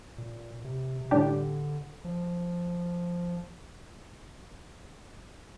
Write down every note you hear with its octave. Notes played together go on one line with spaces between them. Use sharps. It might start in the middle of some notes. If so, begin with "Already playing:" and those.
A#2
C3
C3
A2 D3 G3 D4 G4
F3